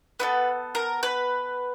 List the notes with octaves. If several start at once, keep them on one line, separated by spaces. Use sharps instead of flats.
B3 E4 A4 B4
A#4
B4